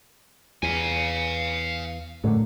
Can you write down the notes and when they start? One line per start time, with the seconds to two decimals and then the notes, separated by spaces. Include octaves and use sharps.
0.63 E2 F5 G#5
2.24 F#2 A2 D3